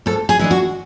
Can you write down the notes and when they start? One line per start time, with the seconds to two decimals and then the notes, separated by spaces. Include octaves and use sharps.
0.06 G#2 A4
0.29 G#4
0.39 E3 G#3 D4
0.51 F#4